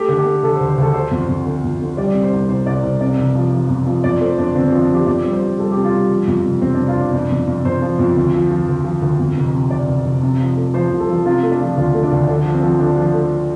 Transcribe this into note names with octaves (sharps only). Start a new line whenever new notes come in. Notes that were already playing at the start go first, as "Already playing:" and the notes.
Already playing: A3 G4
D3
G4
A3
D3 A4
C5
D2
C5
D2 A4
D3 C5
F2
F2
D3
F2
D3
G3 D5
C3
C5
C2
C2 C5
C2 D5
C2 C5
C3 D5
F1
F3
F3
F2
F3
F2 D5
A3 C5
F2 D4
G1 C4
F3 C4
D4
F3 G4
F2 D5
G3
C5
G3
G3 A4
C3 G4
F4
G3 D4
F3
F2
F1
F2 C4
F1 D4
F4
F1
D4
F2
F2
F2
F2 C5
F3
F2
D2
F3
F3
D2
F3
D2
F2
F1
C3
F1 D5
F1
F1
C3
F3
A3
F3 C5
C2
A4
F3
C3 F4
A3
D4
F3
D2 F4
A3
D4
D2
D3 D4
F3
C4
F3
D3 D4
F3
A3